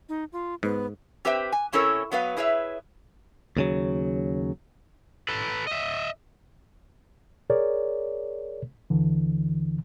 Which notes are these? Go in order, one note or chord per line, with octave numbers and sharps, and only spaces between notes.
D#4
F4
G#2 B3
C4 G4 B4 C5 E5 G5
G#5
C3 C#4 E4 A4 A#4 C#5
F#3 B3 B4 F5
E4 G#4 B4 C#5 E5
D#2 C#3 F#3
A4 B4
D#5 E5
G#4 A#4 C#5 D5
D#2 D3 E3